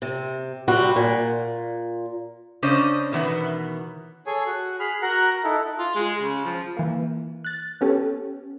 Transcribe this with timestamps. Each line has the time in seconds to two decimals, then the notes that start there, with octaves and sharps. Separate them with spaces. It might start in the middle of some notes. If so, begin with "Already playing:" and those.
0.02 C3
0.68 C3 G3 C4 F#4
0.96 A#2
2.63 C#3 C#4 D4 C5 D5 D#5
3.12 B2 D#3 E3 B3
4.26 G#4 A4 C#5 G#5
4.46 F#4
4.79 G#4 B5 F6
5.02 F#4 A#4 F#5 A#5 F#6
5.44 D#4 E4 A4
5.79 F4
5.95 G#3
6.22 C#3
6.45 F3
6.77 E3 A#3
7.44 F#6 A6
7.81 B3 C#4 G4 A4